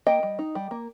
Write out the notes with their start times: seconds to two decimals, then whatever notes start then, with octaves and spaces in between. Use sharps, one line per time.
0.07 A#3 D#5 G5
0.23 G3
0.39 D#4
0.55 G3
0.71 A#3